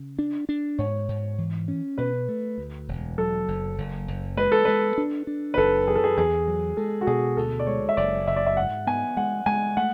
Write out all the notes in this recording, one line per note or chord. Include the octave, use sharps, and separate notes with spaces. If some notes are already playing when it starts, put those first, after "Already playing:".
Already playing: C#3
D4
D4
G#2 C#5
G#2
E3
C#4
B2 B4
A3
D2
E1
F#3 A4
F#1
F#1
F#1
G#3 B4
A4
G#3 B4
D4
D4
B4
F#1 A4
F#2 G#4
A4
G#4
E2 G#4
F#3
G#3 A4
F#4
B2 G#4
D2 A4
D5
G#3 C#5
E5
F#1 D5
F#1 E5
D5
E5
G#2 F#5
B3 G#5
G#3 F#5
G#3 G#5
A3 F#5